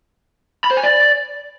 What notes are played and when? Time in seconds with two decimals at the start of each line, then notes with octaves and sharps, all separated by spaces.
0.64 B5
0.71 C5
0.77 G#5
0.84 D5